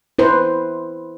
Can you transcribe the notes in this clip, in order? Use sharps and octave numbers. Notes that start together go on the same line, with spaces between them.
E4 B4 C5